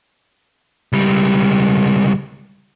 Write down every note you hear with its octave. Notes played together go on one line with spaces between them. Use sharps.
C#2 G3